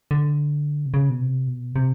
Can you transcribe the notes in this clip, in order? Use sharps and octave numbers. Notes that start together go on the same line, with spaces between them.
D3
C3
C#3
B2
C3
B2
C3